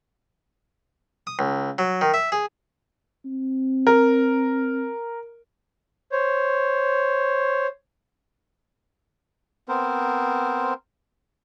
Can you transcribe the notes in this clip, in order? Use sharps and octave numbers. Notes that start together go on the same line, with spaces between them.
D#6
C#2
F#3
D#3
E5
G#4
C4
A#4
C5 C#5
B3 C4 A#4 C5